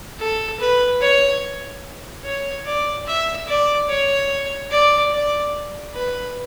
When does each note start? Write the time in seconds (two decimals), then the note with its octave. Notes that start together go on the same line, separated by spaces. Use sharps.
0.19 A4
0.60 B4
1.01 C#5
2.24 C#5
2.65 D5
3.06 E5
3.47 D5
3.89 C#5
4.70 D5
5.12 D5
5.94 B4